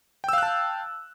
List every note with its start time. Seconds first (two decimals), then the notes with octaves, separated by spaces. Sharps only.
0.24 G5
0.29 E6
0.33 F5
0.38 F#6
0.43 A5